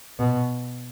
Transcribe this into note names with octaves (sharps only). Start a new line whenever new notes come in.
B2